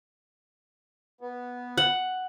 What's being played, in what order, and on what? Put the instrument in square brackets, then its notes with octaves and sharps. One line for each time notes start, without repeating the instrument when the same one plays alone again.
[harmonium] B3
[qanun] F#5